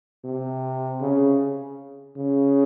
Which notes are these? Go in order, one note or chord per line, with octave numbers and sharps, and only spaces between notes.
C3
C#3
C#3